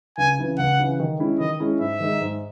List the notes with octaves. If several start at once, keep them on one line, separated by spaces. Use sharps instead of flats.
C#2 G#5
C#3 E3
C#2 F#5
C#3 E3
D#3
G#3 C#4 E4
D#3 D#5
G#3 C#4 E4
G#2 E5
D#3 G#3 D#4
G#2